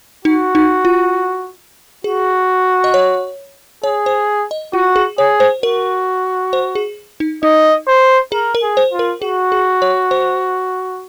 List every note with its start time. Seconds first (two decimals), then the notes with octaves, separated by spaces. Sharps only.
0.25 D#4 F#4
0.55 D#4
0.85 F4
2.04 F#4 G#4
2.84 D#5
2.94 C#5
3.84 G#4 C#5
4.06 C5
4.51 D#5
4.73 F4 F#4
4.96 G#4
5.18 G#4 C#5
5.40 C5
5.62 F#4 A#4
6.53 C5
6.75 G#4
7.20 D#4
7.43 D#4 D#5
7.87 C5
8.32 G#4 A#4
8.55 A#4
8.62 G#4
8.77 C5
8.92 F4
8.99 A#4
9.22 F#4 G#4
9.52 G#4
9.82 C#5
10.11 C5